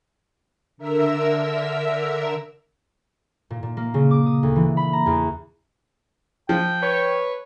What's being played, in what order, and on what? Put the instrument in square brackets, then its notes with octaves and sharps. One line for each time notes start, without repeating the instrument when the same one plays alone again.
[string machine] D3 A#4 E5 E6
[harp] A#2
A#2
A#3
C#3
D6
D#6
D2
E3
B5
A#5
E2
[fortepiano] F3 [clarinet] G5
[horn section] B4 C#5